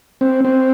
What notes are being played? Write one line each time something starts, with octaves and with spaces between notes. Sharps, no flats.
C4
C4